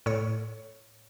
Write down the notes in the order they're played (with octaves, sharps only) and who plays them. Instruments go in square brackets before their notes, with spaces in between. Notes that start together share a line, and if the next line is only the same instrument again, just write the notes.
[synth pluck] A2 C#5